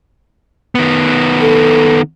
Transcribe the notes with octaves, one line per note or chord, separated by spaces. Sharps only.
D#3 B3
A4